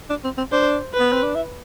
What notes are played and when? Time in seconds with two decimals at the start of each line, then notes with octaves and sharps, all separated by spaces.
0.10 D4
0.24 C4
0.38 C4
0.52 D4 C5
0.94 B4
1.00 B3
1.12 C4
1.23 D4
1.35 E4